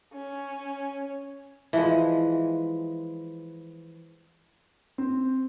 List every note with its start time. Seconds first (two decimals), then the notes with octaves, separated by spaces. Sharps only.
0.14 C#4
1.73 E3 F3 G#3
4.98 C4